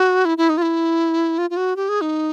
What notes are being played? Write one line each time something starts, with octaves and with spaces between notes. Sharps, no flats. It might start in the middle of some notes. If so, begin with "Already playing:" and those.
Already playing: F#4
E4
E4
D#4
F4
E4
F4
F4
F#4
G4
G#4
D#4